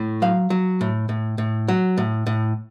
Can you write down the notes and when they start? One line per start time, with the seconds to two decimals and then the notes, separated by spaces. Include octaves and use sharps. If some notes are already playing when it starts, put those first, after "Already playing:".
Already playing: A2
0.22 F#3 F5
0.50 F#3
0.81 A2
1.09 A2
1.38 A2
1.68 F#3
1.98 A2
2.27 A2